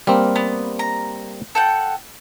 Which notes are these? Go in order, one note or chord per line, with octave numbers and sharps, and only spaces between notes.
G3 A#3 C4 F6
B3
A#5
A4 F#5 G5